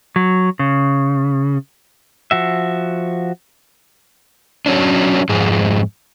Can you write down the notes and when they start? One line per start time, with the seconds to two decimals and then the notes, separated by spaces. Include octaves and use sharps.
0.16 F#3
0.59 C#3
2.31 F3 F#4 E5
4.66 F#3 C#4 D4
5.29 F2 G#2 G#3